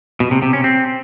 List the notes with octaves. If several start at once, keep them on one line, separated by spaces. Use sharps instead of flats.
B2
C3
C3
C#4
C4